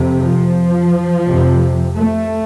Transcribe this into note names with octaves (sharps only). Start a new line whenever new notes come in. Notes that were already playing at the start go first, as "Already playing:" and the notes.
Already playing: F2 C3
F3
F2 C3
A3